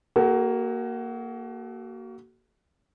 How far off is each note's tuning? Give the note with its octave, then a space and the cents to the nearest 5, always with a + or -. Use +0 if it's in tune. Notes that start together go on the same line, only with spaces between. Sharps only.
A#3 +0 F#4 +30 A4 -40